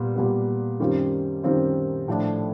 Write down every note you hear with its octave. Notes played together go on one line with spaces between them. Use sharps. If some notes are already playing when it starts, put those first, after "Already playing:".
Already playing: A#2 G3 B3
A#2 G3 B3
F#2 D#3 G3 C4 F4
F#2 D#3 G3 C4 F4
A2 F3 A3 D4